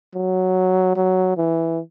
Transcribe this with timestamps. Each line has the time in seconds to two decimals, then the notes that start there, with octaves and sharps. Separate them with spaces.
0.15 F#3
0.96 F#3
1.37 E3